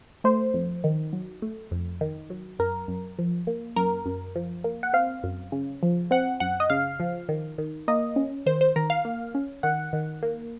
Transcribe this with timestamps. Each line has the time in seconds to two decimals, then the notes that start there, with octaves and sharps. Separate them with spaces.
0.24 A3 C5
0.54 F2
0.84 D#3
1.13 F#3
1.42 A3
1.71 F2
2.01 D#3
2.30 F#3
2.59 F#2 A#4
2.88 F#2
3.18 F3
3.47 A#3
3.76 F#2 A#4
4.06 F#2
4.36 F3
4.64 A#3
4.83 F#5
4.93 C4 F5
5.24 F#2
5.52 C#3
5.83 F3
6.11 C4 F#5
6.40 F#2 F#5
6.60 D#5
6.70 C#3 F5
7.00 F3
7.29 D#3
7.58 D#3
7.88 A#3 D#5
8.16 C#4
8.46 D#3 C5
8.61 C5
8.76 D#3 A#4
8.90 F5
9.05 A#3
9.35 C#4
9.63 D#3 F#5
9.93 D#3
10.23 A#3